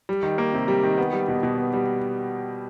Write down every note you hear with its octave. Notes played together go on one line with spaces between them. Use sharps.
G3
D#3
A#3
C3
G3
D#3
B3
G3
B2
B2
B3
G3